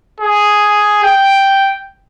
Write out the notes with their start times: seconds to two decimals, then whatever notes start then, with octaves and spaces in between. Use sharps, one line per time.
0.20 G#4
1.04 G5